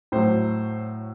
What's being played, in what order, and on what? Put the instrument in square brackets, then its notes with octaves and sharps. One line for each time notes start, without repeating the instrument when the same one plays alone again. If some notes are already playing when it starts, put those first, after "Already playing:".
[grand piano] A2 F#3 C5